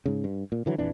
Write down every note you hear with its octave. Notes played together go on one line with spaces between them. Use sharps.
G#2 C#3
G2
A#2
D3 E3 F#3
A#1 F2 E3 D4